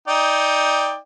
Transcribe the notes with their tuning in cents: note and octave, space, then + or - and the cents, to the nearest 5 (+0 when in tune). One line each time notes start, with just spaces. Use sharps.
D#4 +15 D5 +0 G5 +15